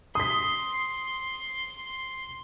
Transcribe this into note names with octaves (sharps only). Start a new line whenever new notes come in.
C6 D#6 B6